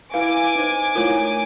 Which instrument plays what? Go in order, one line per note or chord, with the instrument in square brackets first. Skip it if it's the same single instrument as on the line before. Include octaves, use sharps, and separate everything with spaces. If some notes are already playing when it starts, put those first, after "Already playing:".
[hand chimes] E4 B4 [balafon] F5 [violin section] G#5 D6
[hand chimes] D#4 C5
[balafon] A3 E4 F4 [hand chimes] A#4 C#5 G#6